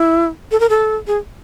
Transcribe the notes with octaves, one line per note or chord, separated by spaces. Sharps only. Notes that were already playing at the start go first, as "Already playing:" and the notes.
Already playing: E4
A4
A#4
A4
G#4